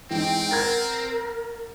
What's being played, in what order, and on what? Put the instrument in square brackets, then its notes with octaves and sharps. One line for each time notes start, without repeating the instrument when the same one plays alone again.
[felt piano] E3 G#3 D#4 [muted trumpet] C4 [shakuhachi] G5
[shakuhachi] A#4 [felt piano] F#5 G#6 A6